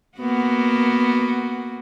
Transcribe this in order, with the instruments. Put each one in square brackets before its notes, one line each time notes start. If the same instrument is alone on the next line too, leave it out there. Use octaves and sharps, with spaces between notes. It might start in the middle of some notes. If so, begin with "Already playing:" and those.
[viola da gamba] A#3 B3 F#4